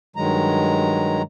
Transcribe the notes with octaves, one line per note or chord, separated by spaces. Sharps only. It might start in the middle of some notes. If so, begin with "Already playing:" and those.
G2 D#3 F#3 G#3 A#5